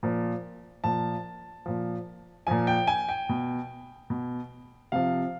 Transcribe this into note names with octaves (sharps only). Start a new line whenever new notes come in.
A#2 F3
A#2 F3 A5
A#2 F3
A#2 F3 G#5
G5
G#5
G5
B2
B2
C3 F3 F5